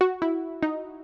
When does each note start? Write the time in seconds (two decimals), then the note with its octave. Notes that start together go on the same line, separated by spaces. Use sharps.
0.01 F#4
0.22 E4
0.63 D#4